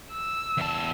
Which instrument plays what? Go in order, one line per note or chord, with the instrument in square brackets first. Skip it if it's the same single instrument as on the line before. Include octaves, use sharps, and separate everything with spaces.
[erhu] E6
[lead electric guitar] E2 A5